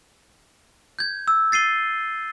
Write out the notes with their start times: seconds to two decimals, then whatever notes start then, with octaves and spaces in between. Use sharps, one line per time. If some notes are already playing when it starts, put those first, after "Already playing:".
0.99 G6 G#6
1.28 E6
1.52 A6 C7 D#7 G7